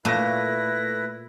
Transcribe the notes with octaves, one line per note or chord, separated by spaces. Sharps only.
A#2 A3 E4 B4 A#6